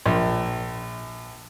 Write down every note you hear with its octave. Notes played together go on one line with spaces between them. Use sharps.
A#1